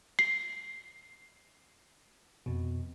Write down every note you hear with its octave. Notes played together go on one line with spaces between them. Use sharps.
C7
F2 B2